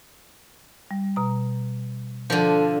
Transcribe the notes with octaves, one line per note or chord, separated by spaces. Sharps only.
G3
B2 A#5
D3 F3 A4 G6